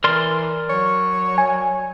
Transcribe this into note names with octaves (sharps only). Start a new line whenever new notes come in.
E3 A#4 D5 C6
F#3 C#5
G#5